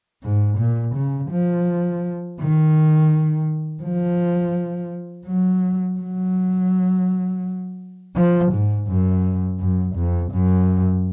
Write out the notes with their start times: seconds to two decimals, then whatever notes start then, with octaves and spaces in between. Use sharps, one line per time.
0.23 G#2
0.58 A#2
0.95 C#3
1.31 F3
2.39 D#3
3.83 F3
5.27 F#3
5.99 F#3
8.16 F3
8.52 G#2
8.87 F#2
9.59 F#2
9.95 F2
10.31 F#2